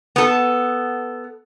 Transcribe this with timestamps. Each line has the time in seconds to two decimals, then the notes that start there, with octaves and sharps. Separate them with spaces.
0.16 B3 A4